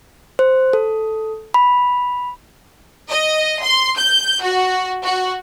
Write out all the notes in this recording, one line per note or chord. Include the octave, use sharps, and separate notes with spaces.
C5
A4
B5
D#5
C6
G6
F#4
F#4